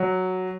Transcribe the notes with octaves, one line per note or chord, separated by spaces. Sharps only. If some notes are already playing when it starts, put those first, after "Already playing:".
Already playing: F#3